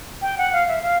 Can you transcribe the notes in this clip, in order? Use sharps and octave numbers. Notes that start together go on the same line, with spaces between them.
G5
F#5
F5
E5
F5